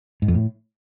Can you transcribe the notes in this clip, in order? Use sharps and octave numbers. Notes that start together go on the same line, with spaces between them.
G#2
F2
A2